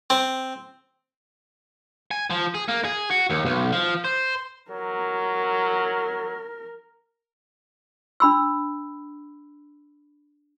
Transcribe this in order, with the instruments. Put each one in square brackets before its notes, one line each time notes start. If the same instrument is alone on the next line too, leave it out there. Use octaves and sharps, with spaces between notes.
[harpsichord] C4
[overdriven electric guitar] G#5
F3
G#4
A#3
G#4
F#4
D#2
B1
F3
C5
[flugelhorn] F#3 [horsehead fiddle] A#4
[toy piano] D4 B5 E6